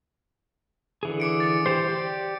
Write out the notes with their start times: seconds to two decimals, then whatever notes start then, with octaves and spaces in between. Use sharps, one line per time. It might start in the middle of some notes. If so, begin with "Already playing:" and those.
1.03 D3 E3 G#4
1.20 D6 C#7 D7
1.40 A6
1.66 E3 G4 C5
1.89 G4 D5